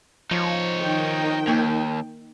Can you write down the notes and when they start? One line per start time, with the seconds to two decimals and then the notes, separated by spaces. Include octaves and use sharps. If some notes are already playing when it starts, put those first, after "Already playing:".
0.31 F3 D#4 C#5
0.81 D#3 G5
1.47 D#2 A#3 D#4